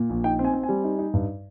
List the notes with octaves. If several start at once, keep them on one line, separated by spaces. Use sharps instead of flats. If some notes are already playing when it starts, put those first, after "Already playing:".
Already playing: A#2
A#1
D#4 G5
C4
G#5
C4
G#5
G3
D#4
D#4
G2